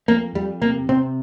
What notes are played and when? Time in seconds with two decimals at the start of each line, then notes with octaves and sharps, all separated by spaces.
0.08 F2 A#3
0.35 F2 G3
0.61 C3 A#3
0.89 C3 C4